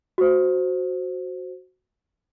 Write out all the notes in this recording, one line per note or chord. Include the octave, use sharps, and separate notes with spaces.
F#4 C5